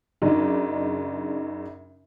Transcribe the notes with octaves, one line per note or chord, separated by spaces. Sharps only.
F#2 C#3 D4 D#4